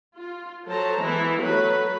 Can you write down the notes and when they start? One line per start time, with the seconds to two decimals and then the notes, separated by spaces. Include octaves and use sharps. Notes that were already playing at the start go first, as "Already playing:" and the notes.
0.16 F4
0.66 F#3 A4 C5 A5 A#5
0.99 E3 G#3 B3 E4
1.41 F#3 A3 B4